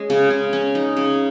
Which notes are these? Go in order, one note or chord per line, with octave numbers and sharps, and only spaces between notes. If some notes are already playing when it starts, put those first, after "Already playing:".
Already playing: G#3 C#4
C#3
C#3
C#4
D#4
C#3